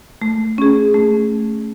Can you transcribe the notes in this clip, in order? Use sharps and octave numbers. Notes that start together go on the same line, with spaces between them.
A3
C#4 G#4
A3